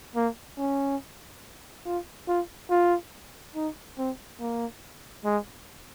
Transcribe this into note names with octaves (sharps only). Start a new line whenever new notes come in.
A#3
C#4
F4
F4
F4
D#4
C4
A#3
G#3